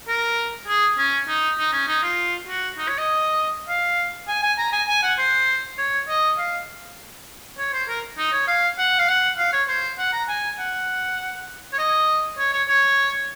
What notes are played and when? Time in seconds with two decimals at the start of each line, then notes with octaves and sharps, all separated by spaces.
0.08 A#4
0.67 G#4
0.98 C#4
1.28 D#4
1.58 D#4
1.73 C#4
1.88 D#4
2.03 F4
2.47 F#4
2.78 D#4
2.88 C#5
2.98 D#5
3.68 F5
4.28 G#5
4.43 G#5
4.58 A#5
4.73 G#5
4.88 G#5
5.03 F#5
5.18 C5
5.78 C#5
6.09 D#5
6.38 F5
7.58 C#5
7.73 C5
7.89 A#4
8.18 D#4
8.33 C#5
8.48 F5
8.78 F#5
8.99 F5
9.09 F#5
9.39 F5
9.53 C#5
9.69 C5
9.98 F#5
10.13 A#5
10.29 G#5
10.59 F#5
11.73 C#5
11.79 D#5
12.38 C#5
12.53 C#5
12.68 C#5